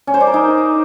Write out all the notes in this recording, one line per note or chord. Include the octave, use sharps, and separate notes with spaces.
C#4
C5
D5
A#4
D#4